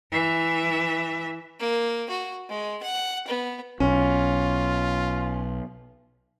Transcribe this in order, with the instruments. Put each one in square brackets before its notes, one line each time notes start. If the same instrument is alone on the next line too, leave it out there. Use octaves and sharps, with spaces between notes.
[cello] E3 E5
[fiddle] A#3
F#4
G#3
F#5
B3
[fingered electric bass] B1 [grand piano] C#4 [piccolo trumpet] F4